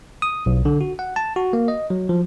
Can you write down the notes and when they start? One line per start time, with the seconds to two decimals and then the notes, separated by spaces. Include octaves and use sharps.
0.22 D#6
0.46 B1
0.65 D3
0.81 F#4
0.99 F#5
1.16 A5
1.36 F#4
1.53 A#3
1.68 D#5
1.90 F#3
2.09 F3